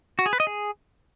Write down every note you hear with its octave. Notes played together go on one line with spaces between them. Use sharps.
F#4
G#4
B4
D#5
G#4